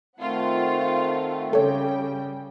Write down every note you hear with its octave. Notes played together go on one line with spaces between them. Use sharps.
D#3 A3 C4 F4 F#5
C#3 G3 A4 C#5 G5